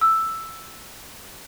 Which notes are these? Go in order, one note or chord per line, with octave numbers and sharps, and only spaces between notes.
E6